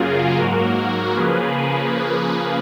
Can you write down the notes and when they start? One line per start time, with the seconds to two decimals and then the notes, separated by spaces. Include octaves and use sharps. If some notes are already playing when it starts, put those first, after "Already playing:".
Already playing: F#2 C#3 F#3 A#3 F4 G#4
0.37 G#2 F#3 A#3 F#4 A#4
1.15 C#3 F3 A#3 G#4 B4